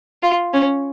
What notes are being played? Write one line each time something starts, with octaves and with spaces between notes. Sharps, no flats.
F4
C#4